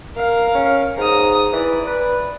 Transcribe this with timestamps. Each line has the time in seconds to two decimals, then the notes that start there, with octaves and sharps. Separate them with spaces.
0.15 A#4 F5
0.55 C#4
0.97 G#2 A#5 D#6
1.52 E3 D5
1.87 B4